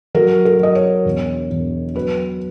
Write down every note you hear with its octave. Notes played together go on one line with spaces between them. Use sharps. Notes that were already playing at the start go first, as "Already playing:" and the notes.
F#3 A#4
A#4
F#3 D#5
C#5
E1
E1
F#3 B4